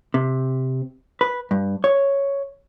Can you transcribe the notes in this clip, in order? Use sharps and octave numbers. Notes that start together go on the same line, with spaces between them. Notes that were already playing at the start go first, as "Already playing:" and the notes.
C3
B4
G2
C#5